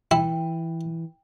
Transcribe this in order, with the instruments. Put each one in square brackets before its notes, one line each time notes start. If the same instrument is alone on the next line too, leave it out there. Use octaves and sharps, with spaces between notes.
[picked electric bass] E3 [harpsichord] E4 [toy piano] G5